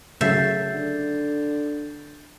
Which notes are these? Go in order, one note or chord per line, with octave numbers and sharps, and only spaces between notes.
F#2 C#3 F#3 A3 E5 G6 A6 C7
D3